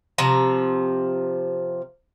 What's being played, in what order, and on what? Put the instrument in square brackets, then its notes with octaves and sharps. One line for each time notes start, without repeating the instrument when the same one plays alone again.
[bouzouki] C3 F3 A#5